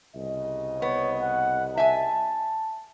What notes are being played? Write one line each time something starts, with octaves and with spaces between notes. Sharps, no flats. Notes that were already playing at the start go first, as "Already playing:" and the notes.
C2 C#3 D#5
B3 C#5
F#5
E5 G#5 A5